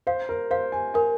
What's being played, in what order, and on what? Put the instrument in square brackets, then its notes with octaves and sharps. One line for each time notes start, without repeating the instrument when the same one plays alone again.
[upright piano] C5 [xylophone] F5
[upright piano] A#4
[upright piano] C5 [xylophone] F5
[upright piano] G#5
[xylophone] A#4 [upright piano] G#5